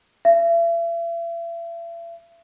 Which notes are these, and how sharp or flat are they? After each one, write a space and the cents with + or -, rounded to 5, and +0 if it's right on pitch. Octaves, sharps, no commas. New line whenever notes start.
E5 +40